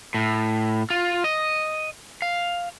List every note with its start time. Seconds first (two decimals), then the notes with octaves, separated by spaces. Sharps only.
0.14 A2
0.90 F4
1.24 D#5
2.22 F5